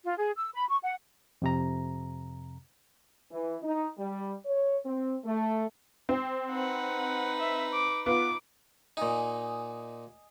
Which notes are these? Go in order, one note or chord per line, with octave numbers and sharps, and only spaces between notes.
F4
G#4
E6
B5
C#6
F#5
F2 C3 A#5
E3
D#4
G3
C#5
C4
A3
C4
D#4 B4 F#5
E5
D6
B3 F4 D6
A#2 D#4 D#5 G#5